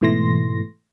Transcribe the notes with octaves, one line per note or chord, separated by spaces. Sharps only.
G#2 B2 E3 A3 C6 A#6